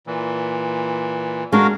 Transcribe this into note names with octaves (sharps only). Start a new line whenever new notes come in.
A#2 E3
G#3 D4 F#4 A#4 F5